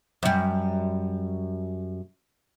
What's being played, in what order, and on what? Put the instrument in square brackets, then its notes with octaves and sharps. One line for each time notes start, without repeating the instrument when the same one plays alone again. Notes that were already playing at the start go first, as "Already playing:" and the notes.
[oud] F#2 G3